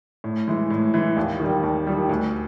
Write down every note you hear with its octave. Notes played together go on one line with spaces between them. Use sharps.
A2
E3 G#3
A2
E3 G#3
D#2
D#3 G3
D#2
D#3 G3
D2